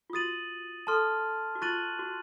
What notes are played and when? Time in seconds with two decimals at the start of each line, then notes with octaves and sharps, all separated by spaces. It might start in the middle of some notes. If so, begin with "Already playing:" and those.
0.10 F4
0.13 F#4 D#6 A6 D#7 F#7
0.87 A4 A5 C6 F6
1.55 F#4
1.62 F4 C#6 F#6 A6 D#7 F#7
1.99 F#4